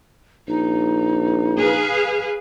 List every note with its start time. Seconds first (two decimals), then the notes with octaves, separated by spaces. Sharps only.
0.48 A#1 D#4
1.59 G#4 B4 F5